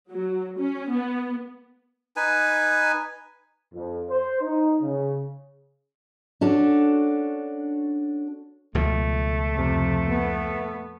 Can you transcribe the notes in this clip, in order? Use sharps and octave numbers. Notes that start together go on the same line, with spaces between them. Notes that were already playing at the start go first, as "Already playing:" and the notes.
F#3
C#4
B3
D#4 B4 G#5
F2
C5
D#4
C#3
C#4 D4 F#4 A4
C#2 B2 F3 A3
F2 C3
B3